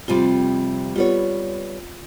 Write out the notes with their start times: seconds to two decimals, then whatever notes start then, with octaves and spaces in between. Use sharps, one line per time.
0.08 F2 C3 G3 C4 F4
0.96 G3 B3 F4 C#5